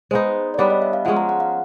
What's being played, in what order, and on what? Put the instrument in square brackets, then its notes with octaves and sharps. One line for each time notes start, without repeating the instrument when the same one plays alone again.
[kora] G#3 B3 D#4 [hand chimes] C5
[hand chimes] D5
[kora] G3 B3 D4 [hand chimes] C#5
[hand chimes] D#5
E5
F5
[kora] F3 G#3 C#4 [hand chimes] F#5
[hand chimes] A#5
F#5
F5